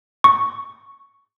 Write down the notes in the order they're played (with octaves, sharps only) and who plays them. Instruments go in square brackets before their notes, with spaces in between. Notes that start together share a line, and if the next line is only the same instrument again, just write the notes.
[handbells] C#6